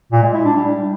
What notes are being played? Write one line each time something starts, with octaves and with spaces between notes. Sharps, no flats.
A#2
G#3
E4
D4
G3